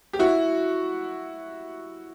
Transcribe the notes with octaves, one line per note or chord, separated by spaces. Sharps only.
G4
E4 F#4